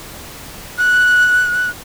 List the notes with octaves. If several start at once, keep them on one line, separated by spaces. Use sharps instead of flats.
F#6